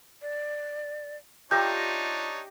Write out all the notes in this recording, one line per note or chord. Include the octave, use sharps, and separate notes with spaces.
D5
D4 D#4 F4 G4 C#5 E5 A#5 G6